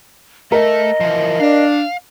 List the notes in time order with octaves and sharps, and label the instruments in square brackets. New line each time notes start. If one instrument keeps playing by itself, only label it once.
[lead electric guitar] A3 [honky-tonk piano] A#4 [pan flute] D#5
[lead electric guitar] E3 F3
[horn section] D4 [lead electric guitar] F5